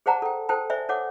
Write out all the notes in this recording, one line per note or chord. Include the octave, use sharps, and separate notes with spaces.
G#4 C5 D5 F#5 A5 A#5
A4 G5
A4 C5 G5 A5
C5 D5 E5 G#5
A4 C#5 F#5 D6